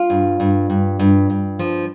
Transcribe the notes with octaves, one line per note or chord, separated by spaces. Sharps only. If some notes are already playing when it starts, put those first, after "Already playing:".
Already playing: F4
G2
G2
G2
G2
G2
F3